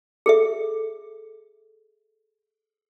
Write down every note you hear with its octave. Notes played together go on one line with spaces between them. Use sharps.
G#4 A4 E5